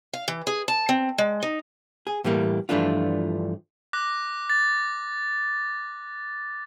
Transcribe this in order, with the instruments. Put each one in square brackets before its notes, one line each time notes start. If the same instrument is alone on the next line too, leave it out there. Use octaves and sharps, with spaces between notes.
[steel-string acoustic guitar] F5
E3
G#4
A5
C4
G#3
D#4
[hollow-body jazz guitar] G#4
A2 E3 G3 A#3
G2 E3 F3 A3 D4 F4
[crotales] D6 F#6 A#6
A6